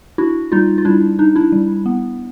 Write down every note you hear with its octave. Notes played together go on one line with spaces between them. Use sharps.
D4 E4 F#4
G3 D#4 F4
F4
G3 D4 E4
D4 D#4
D4 E4
G3
B3